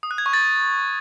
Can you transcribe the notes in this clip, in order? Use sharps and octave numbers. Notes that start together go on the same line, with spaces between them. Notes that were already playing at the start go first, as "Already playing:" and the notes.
D#6
F#6
G#6
C#6
A6